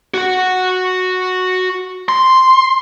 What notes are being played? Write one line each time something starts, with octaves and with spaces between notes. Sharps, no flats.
F#4 F#5
C6